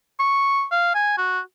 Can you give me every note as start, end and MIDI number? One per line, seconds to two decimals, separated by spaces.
0.19 0.64 85
0.71 0.92 77
0.95 1.14 80
1.17 1.40 66